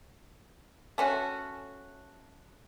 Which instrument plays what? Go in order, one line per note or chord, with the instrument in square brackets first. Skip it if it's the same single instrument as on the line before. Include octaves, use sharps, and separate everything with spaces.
[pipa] A3 C#4 F#4